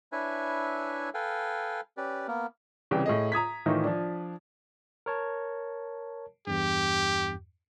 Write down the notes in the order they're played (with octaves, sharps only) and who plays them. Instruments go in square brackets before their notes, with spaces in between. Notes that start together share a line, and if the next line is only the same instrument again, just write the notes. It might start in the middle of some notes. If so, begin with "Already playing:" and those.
[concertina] D4 E4 B4 C#5 E5 G#5
A4 B4 F5 G5 G#5
C#4 G4 B4 D5
A#3 B3 A#4
[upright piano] C2 C#3 E3 C#4 G5
A2 G#4 D#5
A#5 D#6 G#6 B6
A2 D#3 E3 D#4 F4
F3 D4
[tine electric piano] A#4 C#5 A5
[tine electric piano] E2 G2 [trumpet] G4